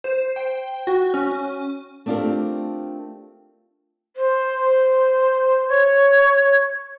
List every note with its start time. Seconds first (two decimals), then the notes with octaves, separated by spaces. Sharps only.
0.04 C5
0.36 G5
0.87 F#4
1.14 C#4
2.06 A3 C4 D4 F4 G4 A#4
4.17 C5
5.68 C#5